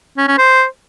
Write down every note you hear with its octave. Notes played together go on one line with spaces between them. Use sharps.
C#4
C#4
C5